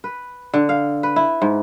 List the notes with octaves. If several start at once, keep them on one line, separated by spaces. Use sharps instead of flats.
B4
D3
F5
B4
E4
G#2